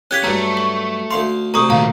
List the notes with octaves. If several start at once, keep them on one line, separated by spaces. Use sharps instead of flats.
C#4 G4 F5 F#6 G#6 B6
G2 F#3 A3 A#5
C#6
D2 F5 C6
D2 C3 A#5 C#6 D#6
A#2 D#3 F5 A#5